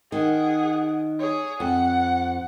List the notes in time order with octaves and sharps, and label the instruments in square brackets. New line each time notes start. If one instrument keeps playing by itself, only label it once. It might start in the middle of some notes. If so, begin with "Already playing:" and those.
[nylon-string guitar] D#3 [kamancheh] G#4 F#5
[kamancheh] G#4 C#5
[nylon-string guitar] F2 [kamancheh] F#5